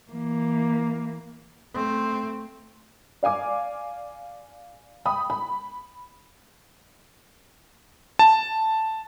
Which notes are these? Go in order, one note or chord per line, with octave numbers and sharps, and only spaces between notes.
E3 A#3
A3 C4
D5 F5 G#5 D6
G5 B5 D#6
B5
A5